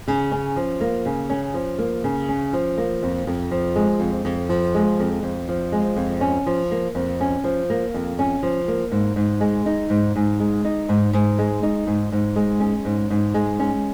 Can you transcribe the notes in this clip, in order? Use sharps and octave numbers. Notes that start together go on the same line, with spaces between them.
C#3
C#4
F3
A#3
C#3
C#4
F3
A#3
C#3
C#4
F3
A#3
F2
F2
F3
G#3
F2
F2
F3
G#3
F2
F2
F3
G#3
F2
C#4
F3
A#3
F2
C#4
F3
A#3
F2
C#4
F3
A#3
G#2
G#2
G#3
D#4
G#2
G#2
G#3
D#4
G#2
G#2
G#3
D#4
G#2
G#2
G#3
C#4
G#2
G#2
G#3
C#4